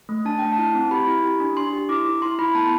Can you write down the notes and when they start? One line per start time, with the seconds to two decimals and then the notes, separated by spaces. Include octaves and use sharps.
0.09 A3
0.25 D4 A5
0.39 A3 G5
0.52 A5
0.58 E4
0.75 C4
0.91 G4 B5
1.07 E4
1.24 G4
1.40 D4
1.57 D4 C6
1.73 G4
1.89 E4 D6
2.06 E4
2.22 E4 C6
2.39 E4 B5
2.55 B3 A5